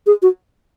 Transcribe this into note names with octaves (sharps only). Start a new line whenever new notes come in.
G#4
F#4